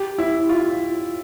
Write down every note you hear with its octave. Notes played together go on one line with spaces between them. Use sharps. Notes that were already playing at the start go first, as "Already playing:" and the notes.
Already playing: G4
E4
F4